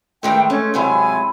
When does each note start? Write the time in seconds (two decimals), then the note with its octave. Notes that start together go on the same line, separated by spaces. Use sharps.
0.23 A2 D#3 E3 G#3 E5 G5
0.50 A3 C#4
0.74 G#2 C3 F#3 C4 E4 G#5